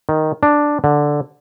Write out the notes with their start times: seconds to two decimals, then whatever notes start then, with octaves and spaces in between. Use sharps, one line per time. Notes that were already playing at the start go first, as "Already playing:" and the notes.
0.09 D#3
0.43 D4
0.84 D3